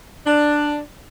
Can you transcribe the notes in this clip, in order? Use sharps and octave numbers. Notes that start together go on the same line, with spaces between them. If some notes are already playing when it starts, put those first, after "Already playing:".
D4